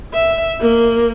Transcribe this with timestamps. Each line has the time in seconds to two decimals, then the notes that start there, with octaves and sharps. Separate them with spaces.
0.14 E5
0.60 A#3